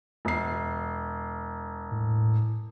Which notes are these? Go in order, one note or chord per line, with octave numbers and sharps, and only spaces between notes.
E1 C7
A2